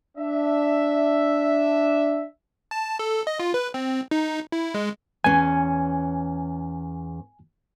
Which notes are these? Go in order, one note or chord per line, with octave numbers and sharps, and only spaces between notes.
D4 E5
A5
A4
D#5
F4
B4
C4
D#4
E4
G#3
E2 C#4 G#5